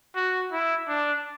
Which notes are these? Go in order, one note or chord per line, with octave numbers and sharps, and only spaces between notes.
F#4
E4
D4